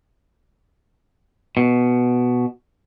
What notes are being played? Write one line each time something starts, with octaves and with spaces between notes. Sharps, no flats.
B2